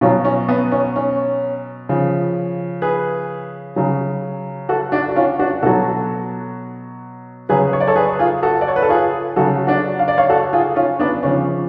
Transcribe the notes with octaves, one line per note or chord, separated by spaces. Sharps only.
B2 F#3 C#4 F4
C#4
B3
C#4
C#4
C#3 F3
G#4 B4
C#3 F#3
F#4 A4
D4 F#4
F#4
C#4 F4
D4 F#4
B2 F#3 F#4 A4
C#3 F#3 G#4 B4
C#5
D5
A4 C#5
G#4 B4
F4 G#4
F#4 A4
D5
C#5
B4
A4
F4 G#4
C#3 F#3 F#4 A4
D4 F#4
F5
D5
C#5 F5
F#4 A4
F4 G#4
C#4 F4
B3 D4
C#3 F3 C#4